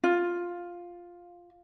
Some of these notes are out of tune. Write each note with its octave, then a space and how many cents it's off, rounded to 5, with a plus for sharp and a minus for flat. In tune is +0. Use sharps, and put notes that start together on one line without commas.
F4 +5